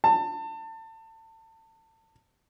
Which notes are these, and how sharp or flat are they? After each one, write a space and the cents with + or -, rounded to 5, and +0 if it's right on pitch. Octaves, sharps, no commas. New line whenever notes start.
A5 +30